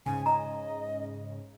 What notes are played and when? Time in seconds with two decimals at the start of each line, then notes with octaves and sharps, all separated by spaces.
0.06 G#2 C#3 G#5
0.26 D#5 A#5